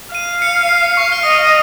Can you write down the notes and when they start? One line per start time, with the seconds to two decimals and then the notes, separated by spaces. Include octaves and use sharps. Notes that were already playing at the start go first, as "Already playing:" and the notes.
0.15 F5 D#7
0.42 C#7
0.61 C#7
0.69 C7
0.97 C#6
1.12 F6
1.23 D#5 D#6